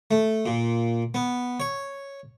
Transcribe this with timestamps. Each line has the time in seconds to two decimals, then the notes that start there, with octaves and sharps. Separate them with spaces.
0.11 A3
0.46 A#2
1.14 B3
1.60 C#5